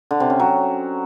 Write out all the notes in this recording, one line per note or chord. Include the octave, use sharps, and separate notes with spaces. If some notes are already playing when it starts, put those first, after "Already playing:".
D3
C3
C#4
F#3